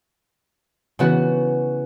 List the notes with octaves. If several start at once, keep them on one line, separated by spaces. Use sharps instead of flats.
C#3 E3 B3 F#4